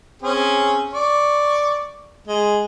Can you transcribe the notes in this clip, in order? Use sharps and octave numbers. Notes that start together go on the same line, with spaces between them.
C4 C#4 G#4
D5 C#6
G#3